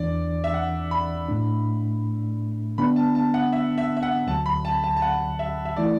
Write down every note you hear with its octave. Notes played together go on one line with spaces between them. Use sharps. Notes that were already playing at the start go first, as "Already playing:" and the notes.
Already playing: E2 E3 D4 D5
E5
F#5
B5
A2 A3 D4
D3 B3 D4 B5
A5
A5
F#5
E5
E5
E5
F#5
D2 D3 F#3 A5
B5
A5
A5
A5
F#5
E5
E5
E3 A3 E4 D5